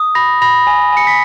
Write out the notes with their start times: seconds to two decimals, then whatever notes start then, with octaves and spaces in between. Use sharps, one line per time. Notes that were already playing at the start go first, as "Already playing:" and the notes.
Already playing: D#6
0.15 B5 A#6
0.42 B5 A#6
0.67 G#5
0.92 G#5 C#7
1.07 B6